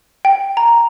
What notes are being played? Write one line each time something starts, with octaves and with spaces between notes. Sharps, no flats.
G5
A#5